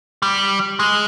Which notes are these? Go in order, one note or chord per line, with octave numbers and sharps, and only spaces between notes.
G3
G#3